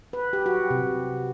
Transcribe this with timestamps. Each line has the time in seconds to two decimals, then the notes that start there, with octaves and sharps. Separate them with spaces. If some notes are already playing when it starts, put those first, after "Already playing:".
0.13 B4
0.33 G4
0.46 F#4
0.70 C3